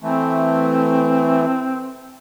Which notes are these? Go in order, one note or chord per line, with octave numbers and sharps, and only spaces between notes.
E3 A3 C4